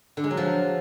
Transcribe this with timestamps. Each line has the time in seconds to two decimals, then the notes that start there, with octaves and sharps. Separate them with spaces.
0.17 D3
0.24 G#3
0.31 F#3
0.37 F3